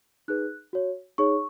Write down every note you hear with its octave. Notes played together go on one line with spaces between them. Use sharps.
D#4 G#4 B4 F#6
F#4 C#5
D#4 G#4 C#5 C#6